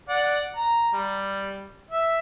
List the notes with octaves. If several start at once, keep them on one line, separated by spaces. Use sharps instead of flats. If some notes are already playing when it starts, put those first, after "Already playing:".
D5 F#5
A#5
G3
E5